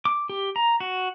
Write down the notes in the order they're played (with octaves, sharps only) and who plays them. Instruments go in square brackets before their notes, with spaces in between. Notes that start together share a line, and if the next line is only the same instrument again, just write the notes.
[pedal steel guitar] D6
G4
A#5
F#4